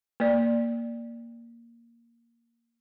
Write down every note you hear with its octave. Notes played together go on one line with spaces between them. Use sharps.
A#3 D5